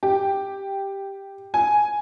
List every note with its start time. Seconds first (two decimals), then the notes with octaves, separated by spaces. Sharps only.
0.03 G4
1.54 G#5